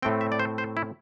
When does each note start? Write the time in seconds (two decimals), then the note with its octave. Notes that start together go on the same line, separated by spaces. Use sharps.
0.03 A2 A3 C4 G5
0.21 E5
0.32 D5
0.39 C5
0.58 C5
0.77 E4